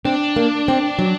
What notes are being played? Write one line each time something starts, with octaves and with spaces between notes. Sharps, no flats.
C4 D4
A#3
C4
F#3